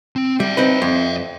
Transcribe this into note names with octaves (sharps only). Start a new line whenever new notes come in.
C4
G3 D5 E5
C4 D#4 B4
F2